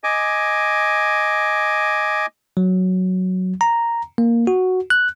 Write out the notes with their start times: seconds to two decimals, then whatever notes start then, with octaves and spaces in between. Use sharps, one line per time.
0.04 D#5 G#5 D6
2.57 F#3
3.61 A#5
4.18 A#3
4.47 F#4
4.90 F#6